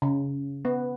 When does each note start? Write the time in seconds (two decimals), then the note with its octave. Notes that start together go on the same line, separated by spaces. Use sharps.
0.02 C#3
0.65 B3